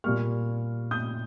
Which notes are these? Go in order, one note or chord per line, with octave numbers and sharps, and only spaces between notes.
A#2 G3 A#3 C#6 F6
D#6 G6